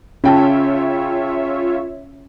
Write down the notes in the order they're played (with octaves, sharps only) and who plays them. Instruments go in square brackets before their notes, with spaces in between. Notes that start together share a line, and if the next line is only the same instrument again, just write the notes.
[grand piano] C#3 G5 A5 [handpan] C#4 [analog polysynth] F4 C#5 E5